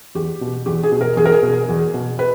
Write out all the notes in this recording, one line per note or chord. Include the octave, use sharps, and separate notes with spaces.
E2 G4
B2
E2 G4
G#4
B2
A#4
E2 G#4
A#4
G#4
B2
E2
B2
B4